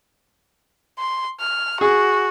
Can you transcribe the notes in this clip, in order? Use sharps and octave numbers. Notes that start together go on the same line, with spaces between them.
C6
F6
F#4 G#4